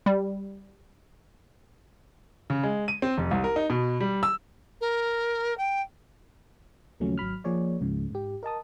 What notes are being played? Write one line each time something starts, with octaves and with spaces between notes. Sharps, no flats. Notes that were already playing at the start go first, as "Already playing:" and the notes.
G3
C#3
G#3
D#7
C4
F1
C2
A#4
D#4
B2
G3
E6
A#4
G5
D#2 C#3 F3 F#3 A3 C#4
G#1 F#3 B5 F6
F3 A#3 G#4 C#5 D5
C#2 G#2 C#3 F3
G#2 G4
A#4 D#5 A5 D#6